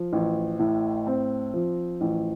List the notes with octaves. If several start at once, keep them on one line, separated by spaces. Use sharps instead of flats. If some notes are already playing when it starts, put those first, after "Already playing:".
Already playing: F3
A1
A2
C4
F3
A1